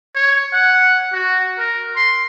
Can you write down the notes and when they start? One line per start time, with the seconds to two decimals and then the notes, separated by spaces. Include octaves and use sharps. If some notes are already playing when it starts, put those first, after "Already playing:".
0.15 C#5
0.53 F#5
1.13 F#4
1.58 A#4
1.96 C6